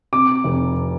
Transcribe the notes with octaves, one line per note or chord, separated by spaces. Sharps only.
C3 D6
F1